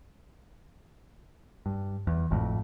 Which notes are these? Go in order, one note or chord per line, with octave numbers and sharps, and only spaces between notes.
G2
E2
G#1 F2 A2